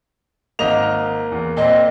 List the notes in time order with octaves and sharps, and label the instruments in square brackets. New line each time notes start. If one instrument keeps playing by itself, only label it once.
[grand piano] G#1 D#5 F7 [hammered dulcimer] A#3
[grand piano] E2
[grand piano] A#2 C4 [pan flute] D#5